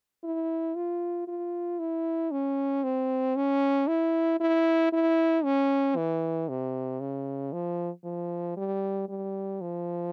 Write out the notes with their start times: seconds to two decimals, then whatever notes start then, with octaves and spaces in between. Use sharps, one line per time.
0.24 E4
0.76 F4
1.28 F4
1.80 E4
2.32 C#4
2.83 C4
3.36 C#4
3.88 E4
4.40 E4
4.93 E4
5.44 C#4
5.96 E3
6.49 C3
7.00 C#3
7.53 F3
8.04 F3
8.57 G3
9.09 G3
9.61 F3